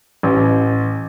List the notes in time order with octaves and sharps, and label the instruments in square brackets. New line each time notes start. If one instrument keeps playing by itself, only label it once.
[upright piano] A1